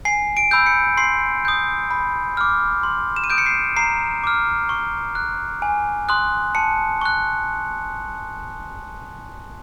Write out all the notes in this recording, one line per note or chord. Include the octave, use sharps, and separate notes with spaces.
G#5 C7
D7
B5 E6 G6
C#7
C6 C7
D#6 G6
B5
D6 F6
C6
E7
D#7
D#6 G6 D7
C#7
C7
A#5 C7
D6 F6
C#6
F#6
G#5
C6 D#6 F#6
A5 C#7
C#6 F#6